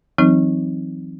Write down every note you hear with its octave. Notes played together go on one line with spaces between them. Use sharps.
E3 F#3 C4 D#4